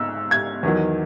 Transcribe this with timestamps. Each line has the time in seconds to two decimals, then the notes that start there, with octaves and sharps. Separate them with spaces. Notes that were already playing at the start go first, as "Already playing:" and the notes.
Already playing: G#2 E6
0.31 G#6
0.63 E2 D#3 F#3